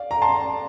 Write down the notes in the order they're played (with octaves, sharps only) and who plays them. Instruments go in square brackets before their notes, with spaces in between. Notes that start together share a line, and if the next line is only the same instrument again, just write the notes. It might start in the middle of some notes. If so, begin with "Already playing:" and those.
Already playing: [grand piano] D5 F5
A#5
A5 C6